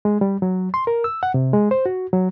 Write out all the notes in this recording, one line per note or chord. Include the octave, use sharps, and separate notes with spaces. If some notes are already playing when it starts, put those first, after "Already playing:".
G#3
G3
F#3
C6
A#4
E6
F#5
C3
G#3
C5
F#4
F#3